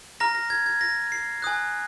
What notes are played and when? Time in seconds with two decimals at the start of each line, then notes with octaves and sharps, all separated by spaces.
0.20 A#5 F6 A#6
0.35 A#6
0.50 G#6
0.66 G#6
0.81 A#6
1.12 C7
1.42 G#5 D#6 F#6